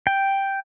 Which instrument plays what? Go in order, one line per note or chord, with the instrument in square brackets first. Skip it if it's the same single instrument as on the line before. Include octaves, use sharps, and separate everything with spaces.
[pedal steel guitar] G5